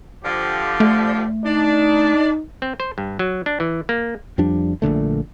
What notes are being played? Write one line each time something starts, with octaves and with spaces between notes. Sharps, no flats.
D3 F3 G4
A3
D4 D#4
C4
C5
G2
F#3
D4
E3
A#3
F2 F3 G3 D4
A#1 A#2 D3 A3